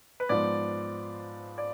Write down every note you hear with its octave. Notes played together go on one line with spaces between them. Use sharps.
B4
G#2 F3 B3 D5
D5